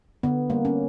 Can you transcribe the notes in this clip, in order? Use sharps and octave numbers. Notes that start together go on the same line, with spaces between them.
D3 B3
G3 A#3
C#4